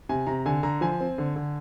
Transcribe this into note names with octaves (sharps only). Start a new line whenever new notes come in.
C3 G#5
C3 A#5
D3 G#5
D3 A#5
F3 G#5
C4
D3
D3